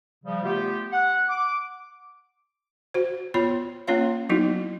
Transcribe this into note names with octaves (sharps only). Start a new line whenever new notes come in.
C#3 F3 G3
A3 B3 F4 G4
F#5
D6
F#4 C5
B3 F4 C#5 B5
A#3 C#4 F4 C#5 F5
F#3 B3 D#4 E4 F#4